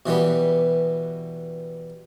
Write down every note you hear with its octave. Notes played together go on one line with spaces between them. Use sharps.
B2 E3 G3 B3